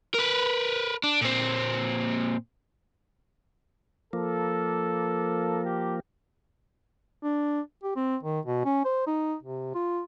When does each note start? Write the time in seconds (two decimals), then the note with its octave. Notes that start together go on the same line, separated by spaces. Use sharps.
0.14 A#4 B4
1.04 D4
1.21 A#2 C4
4.13 F3 A#3 A4
5.65 G4
7.23 D4
7.83 G4
7.96 C4
8.23 D#3
8.46 B2
8.65 C#4
8.85 C5
9.07 D#4
9.43 C3
9.75 F4